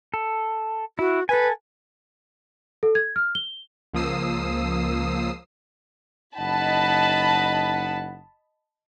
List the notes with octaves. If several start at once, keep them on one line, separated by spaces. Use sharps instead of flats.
A4
E4 F#4
A4 B4 G#5
A4
G#6
F6
G7
C#2 F3 A#3 D#6 E6 C7
F#1 D#4 D#5 F#5 A5 B5